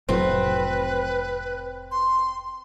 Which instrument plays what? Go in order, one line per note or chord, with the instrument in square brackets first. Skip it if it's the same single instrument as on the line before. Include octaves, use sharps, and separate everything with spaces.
[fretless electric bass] F1 A2 F#3 [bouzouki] C4 [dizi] B4
[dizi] C6